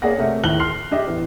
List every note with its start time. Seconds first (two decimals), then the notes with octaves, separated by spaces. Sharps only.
0.02 A#3 G#4 C#5 D5 F#5 A#6
0.18 C3 A3 A#4
0.44 D#2 A2 F#6 F#7 G7
0.60 C6 F6 C7
0.91 D4 G4 D#5 E5
1.07 E2 A2